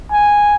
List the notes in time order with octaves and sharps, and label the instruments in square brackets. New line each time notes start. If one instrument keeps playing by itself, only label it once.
[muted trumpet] G#5